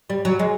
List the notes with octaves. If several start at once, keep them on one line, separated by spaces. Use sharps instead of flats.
G3
F#3
G#3